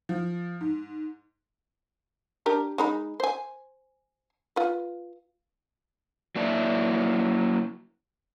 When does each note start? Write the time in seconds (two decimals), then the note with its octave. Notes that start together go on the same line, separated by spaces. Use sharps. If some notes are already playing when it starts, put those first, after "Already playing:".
0.09 F3
0.61 G#2
2.46 D4 G4 A#4
2.78 G#3 D#4 B5
3.20 C5 G#5
4.56 F4 B4
6.36 F#3 A#3 E4 D5 E5 A5